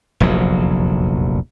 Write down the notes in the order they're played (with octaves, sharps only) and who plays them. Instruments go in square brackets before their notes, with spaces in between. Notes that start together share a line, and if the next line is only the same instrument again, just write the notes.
[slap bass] F1 A#1 E2 F#3